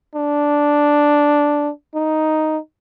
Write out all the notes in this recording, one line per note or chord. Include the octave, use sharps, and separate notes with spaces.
D4
D#4